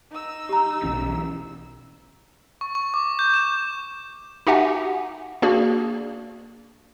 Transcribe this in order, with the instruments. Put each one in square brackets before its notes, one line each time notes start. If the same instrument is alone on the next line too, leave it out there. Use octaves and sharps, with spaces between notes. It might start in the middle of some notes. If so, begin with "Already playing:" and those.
[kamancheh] D#4 E6
[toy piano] G4 A#5
[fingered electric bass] B1 E3 C#4
[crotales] C#6
C#6
D6
G6
E7
[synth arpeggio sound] D#4 F#4 G4 E5 F#5 G#5
A#3 D4 F#4 G#4 D5